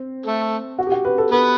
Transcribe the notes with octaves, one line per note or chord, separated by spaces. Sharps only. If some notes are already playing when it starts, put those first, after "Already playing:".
Already playing: C4
A3 A4
F#4
G4
F#4
B4
A4
B3 A4 B4